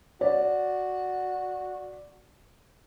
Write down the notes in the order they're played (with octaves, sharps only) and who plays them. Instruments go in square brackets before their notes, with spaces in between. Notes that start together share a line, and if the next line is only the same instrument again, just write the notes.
[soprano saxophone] F#4 [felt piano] D5